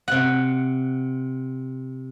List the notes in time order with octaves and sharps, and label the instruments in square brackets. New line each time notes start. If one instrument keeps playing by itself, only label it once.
[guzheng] C3 F#5